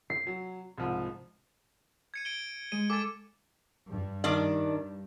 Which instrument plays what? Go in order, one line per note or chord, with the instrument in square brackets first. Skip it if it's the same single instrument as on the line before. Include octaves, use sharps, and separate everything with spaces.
[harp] C7
[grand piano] F#3
C2 G#2 F3
[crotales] G#6 C#7 D#7
D7 D#7 G7
[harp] G#3 [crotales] D#7
[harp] A4 G#5 [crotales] D6 A6
[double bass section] G2
[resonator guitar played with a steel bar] D#3 D4 D5